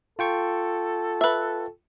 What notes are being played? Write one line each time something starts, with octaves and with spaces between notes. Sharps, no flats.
F4 A4 G5 C#6
B4 E5